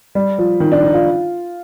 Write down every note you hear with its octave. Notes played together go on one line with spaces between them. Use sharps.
G3
F3
D#3
D4
D#4
F4